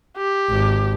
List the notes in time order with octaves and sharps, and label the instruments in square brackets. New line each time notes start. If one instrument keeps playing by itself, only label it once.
[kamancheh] G4
[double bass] G#1